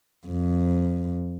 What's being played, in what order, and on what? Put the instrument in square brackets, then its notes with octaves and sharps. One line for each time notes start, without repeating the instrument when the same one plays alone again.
[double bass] F2